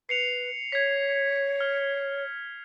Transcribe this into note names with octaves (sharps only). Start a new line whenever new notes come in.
B4 C7 C#7 F7
C#5 G#6 B6
F6